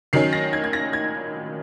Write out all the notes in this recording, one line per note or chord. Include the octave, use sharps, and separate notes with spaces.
D#3 F#3 C#4 C7
A#6
G#6
G#6
A#6
G#6